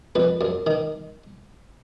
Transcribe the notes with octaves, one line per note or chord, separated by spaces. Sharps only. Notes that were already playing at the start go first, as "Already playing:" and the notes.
F2 B4
F#2
D#3